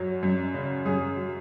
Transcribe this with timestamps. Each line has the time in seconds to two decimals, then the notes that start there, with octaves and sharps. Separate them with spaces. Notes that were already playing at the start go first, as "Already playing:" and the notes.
Already playing: F#2 F#3
0.23 F#2
0.54 C#3
0.86 F#2 G#4
1.16 F#3